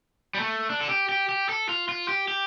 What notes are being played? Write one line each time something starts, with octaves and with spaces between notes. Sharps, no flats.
G3
A3
D4
A4
G4
G4
G4
A4
F4
F4
G4
G4